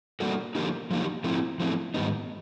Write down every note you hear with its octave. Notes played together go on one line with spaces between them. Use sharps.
G3 A#3 D4 F#4 A4
D3 F3 A#3 D#4 G4
D3 F3 A#3 D#4 G4
F3 A3 C4 E4
F3 A3 C4 E4
G#2 D#3 G3 B3 D#4